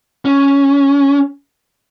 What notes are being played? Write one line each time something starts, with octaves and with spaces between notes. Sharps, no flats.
C#4